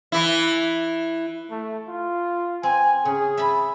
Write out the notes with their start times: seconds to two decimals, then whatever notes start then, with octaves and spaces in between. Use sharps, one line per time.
0.12 E3 E4
1.50 A3
1.88 F4
2.63 C4 G#5
3.05 C#3 G#4
3.37 E5 A5 B5